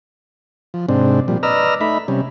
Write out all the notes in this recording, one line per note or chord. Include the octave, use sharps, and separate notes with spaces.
F3
G#2 C3 C4 D4
A#2 F3 G3
B4 D5 D#5 A#5 E6 F6
A3 D#4 E5 B5
C3 G3 C#4